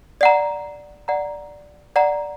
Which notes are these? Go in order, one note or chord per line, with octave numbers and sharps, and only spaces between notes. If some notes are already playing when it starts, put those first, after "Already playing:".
D5 F#5 A#5
D5 F#5 A#5
D5 F#5 A#5